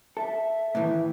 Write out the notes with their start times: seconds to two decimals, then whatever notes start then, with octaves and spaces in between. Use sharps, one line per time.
0.17 A4 E5
0.75 A2 D#3 E3